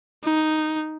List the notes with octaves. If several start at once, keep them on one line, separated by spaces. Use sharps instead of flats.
D#4